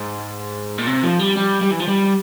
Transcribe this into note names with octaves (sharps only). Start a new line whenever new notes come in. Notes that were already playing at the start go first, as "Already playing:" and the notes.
Already playing: G#2
A#2
C3
F3
G3
G3
G3
E3
F3
G3